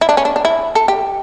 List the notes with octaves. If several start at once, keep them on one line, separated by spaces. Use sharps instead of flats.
E4
D4
C#4
D4
D4
E4
A4
G4